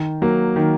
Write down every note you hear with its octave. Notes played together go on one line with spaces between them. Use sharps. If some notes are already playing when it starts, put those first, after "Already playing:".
Already playing: D#3
F#3 A#3
D#3